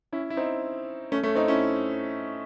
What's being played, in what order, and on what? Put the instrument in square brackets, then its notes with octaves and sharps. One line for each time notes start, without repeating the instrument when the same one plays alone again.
[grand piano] C#4 E4
E4
C4 D#4
A3 C#4
A3 C#4
C4 D#4
C#4 E4